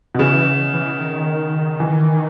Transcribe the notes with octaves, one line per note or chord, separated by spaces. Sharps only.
B2
C#3 E3
E3
D#3
E3